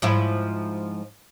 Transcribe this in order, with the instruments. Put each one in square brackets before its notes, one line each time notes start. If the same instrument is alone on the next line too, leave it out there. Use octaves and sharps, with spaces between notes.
[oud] G#2 F3 E4